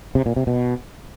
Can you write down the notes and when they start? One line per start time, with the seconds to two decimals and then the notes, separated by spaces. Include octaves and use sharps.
0.15 C3
0.26 A#2
0.36 C3
0.47 B2